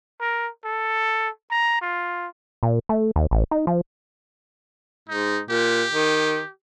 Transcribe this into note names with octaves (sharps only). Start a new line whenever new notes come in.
A#4
A4
A#5
F4
A#2
A3
D#2
A1
D#4
F3
G#2 D#4
A#2 G4
D#3